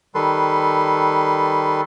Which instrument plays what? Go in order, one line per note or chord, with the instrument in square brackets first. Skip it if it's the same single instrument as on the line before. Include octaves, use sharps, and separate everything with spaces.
[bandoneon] D#3 G3 A4 B4 C6